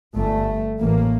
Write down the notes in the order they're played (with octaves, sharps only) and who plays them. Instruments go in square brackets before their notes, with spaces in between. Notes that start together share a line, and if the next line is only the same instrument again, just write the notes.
[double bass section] G1 G2 A3
A1 A2 A#3